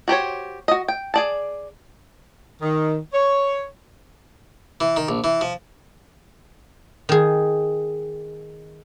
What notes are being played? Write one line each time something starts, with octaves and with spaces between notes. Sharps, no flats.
F#4 G4 C5 C#5
F#4 D#5
G5
G#4 D5 A5
D#3
C#5
E3
D#3
A#1
E3
F3
D#3 G#4